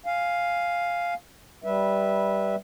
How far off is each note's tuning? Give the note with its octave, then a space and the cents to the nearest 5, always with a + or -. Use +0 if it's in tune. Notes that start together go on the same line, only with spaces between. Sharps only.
F5 +0 G#5 +0
G3 +0 B4 -10 E5 -10